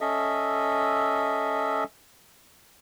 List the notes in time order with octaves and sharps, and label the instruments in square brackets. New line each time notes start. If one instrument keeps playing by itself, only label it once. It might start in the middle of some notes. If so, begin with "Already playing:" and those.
[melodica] C#4 A4 D#5 E5